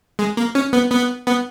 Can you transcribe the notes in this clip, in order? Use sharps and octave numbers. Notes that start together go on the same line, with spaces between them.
G#3
A#3
C#4
B3
B3
B3